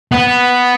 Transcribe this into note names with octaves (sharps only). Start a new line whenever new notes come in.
B3